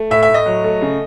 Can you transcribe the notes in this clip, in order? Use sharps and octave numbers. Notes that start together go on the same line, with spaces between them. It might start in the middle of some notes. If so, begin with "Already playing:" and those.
Already playing: A3
A2 E5
E5
A2
D#5
F#3
A3
C#3